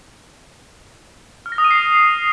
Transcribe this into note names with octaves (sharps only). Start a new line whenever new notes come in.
F6
A#6
D#6
D#7
C7